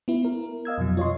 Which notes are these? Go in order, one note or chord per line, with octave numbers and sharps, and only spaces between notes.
B3 E4
A#4
D#5 F5 E6 G#6
F2 B2 F#3
F4 C#5 D#5 C6